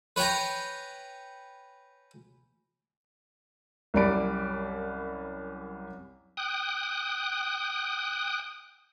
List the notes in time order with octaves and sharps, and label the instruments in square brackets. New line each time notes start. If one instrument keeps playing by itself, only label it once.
[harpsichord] B4 C#5 G5 G#5 A#5
[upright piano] C2 F#2 G3 D5 B5 D7
[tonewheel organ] G5 D#6 F#6